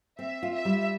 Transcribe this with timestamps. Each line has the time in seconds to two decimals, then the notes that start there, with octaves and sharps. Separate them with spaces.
0.19 C4 E5
0.43 F4
0.54 E5
0.65 G3